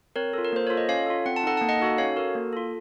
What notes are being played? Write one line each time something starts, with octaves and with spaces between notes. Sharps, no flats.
C4 A#4 C#5
F4 A4
A#4
A#3 C5
F4 A4 C#5
D#5
C#4 C#5 F5
F4 A4
C4 F#5
A5
D#4 A4 F#5
A#3 A5
D#5 F#5
D#4 F#4 A4
C#4 C#5 F5
F#4 A4 A#4
A#3
F4 A4